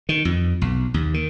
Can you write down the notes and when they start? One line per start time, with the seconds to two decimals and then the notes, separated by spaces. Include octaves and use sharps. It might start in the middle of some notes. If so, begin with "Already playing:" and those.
0.09 D#3
0.25 F2
0.61 B1
0.94 D#2
1.14 D#3